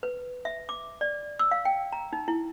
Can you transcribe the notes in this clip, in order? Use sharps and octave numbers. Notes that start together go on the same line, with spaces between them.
B4
E5
D6
D5
E6
F5
G5
A#5
D#4
E4